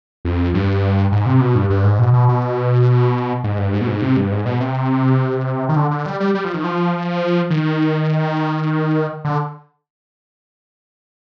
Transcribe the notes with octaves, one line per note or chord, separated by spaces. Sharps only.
F2
G2
G#2
C3
B2
G2
G2
G#2
B2
B2
B2
G#2
G2
G#2
B2
G#2
C3
G2
G#2
B2
C3
D#3
D3
D3
G3
G3
G3
F3
D#3
F3
D#3
D3